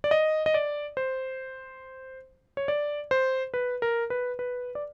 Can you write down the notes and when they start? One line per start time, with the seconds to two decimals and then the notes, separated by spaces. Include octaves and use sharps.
0.04 D5
0.11 D#5
0.46 D#5
0.54 D5
0.97 C5
2.57 C#5
2.68 D5
3.11 C5
3.54 B4
3.82 A#4
4.10 B4
4.39 B4
4.75 D5